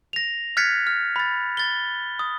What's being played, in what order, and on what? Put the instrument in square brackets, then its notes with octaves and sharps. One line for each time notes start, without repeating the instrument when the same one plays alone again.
[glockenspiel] A#6 F7
F6 F#6 G#6 A6 B6 C#7
F6
B5 A6
A6 G7
D#6